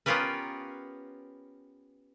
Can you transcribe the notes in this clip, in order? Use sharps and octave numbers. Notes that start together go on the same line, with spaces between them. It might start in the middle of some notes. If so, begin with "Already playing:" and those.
B3 C#4 F4 G4 A#4 B4